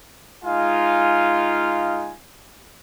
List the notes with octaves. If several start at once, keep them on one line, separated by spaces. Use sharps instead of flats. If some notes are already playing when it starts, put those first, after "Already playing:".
G#3 D#4 F4 F5 G#5